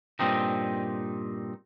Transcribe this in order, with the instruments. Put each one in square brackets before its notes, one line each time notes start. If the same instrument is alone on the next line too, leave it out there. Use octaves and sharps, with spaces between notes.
[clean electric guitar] G2 A#2 C4 D#4